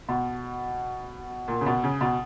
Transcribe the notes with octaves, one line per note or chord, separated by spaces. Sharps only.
B2
A#2
C#3
B2
C#3
B2